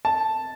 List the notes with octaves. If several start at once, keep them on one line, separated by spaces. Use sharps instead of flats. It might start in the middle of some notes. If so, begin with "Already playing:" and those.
A5